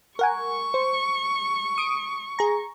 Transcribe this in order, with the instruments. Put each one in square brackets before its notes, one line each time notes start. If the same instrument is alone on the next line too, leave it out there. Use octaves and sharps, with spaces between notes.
[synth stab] A#4 F#5 G#5 [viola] C#6
[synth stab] C5
D#6 D7
G#4 A#5